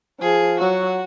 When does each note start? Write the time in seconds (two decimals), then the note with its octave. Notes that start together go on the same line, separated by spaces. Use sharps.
0.20 F3 G#4
0.59 F#3 F#4